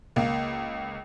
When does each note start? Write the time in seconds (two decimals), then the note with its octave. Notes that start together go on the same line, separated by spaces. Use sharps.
0.16 C#2 A#3